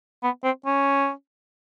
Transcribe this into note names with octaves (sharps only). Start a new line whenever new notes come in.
B3
C4
C#4